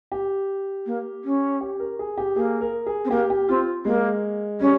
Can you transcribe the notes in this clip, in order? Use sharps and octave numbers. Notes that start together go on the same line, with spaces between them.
G4
A#3
C#4
G4
A#4
G#4
G4
A#3 G#4
A#4
G#4
C4
A#3 G4
G4
C4 F4
G#3 A#3
G3 C#4